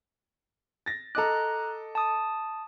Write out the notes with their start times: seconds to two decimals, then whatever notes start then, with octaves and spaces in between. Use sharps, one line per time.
0.86 A6 A#6
1.15 A4 D#5 A#5 D6 F#6
1.95 A5 D#6